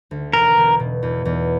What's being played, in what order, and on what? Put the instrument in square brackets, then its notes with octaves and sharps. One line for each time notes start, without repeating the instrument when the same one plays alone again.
[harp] D2
[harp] E1 [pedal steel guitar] A#4
[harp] E1
B2
E2
E2